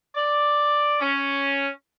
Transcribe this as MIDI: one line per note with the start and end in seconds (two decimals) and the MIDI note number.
0.15 0.96 74
1.01 1.68 61